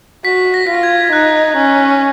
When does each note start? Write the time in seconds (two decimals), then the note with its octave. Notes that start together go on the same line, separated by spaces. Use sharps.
0.25 F#4 B6
0.54 A#6
0.67 F4 B6
0.75 A#6
0.83 G#6
1.04 G#6
1.12 D#4 F#6
1.57 C#4